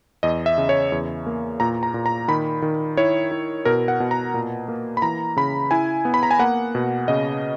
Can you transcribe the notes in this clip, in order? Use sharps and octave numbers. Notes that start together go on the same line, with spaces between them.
E2 D#5
E5
C#3
C#5
E2
A#3
A#2 A#5
A#5
A#2
A#5
D#3 B5
D#3
E4 C#5
E4
B2 A#4
F#5
B2
A#5
A#2
A#3
B5
E3 A#5
C#3 B5
E4 G#5
B3
B5
A#5
G#5
A#3 F#5
B2
C#3 D#5